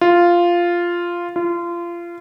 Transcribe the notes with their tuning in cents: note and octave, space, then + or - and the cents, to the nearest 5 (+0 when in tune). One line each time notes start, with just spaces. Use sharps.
F4 -5
F4 -25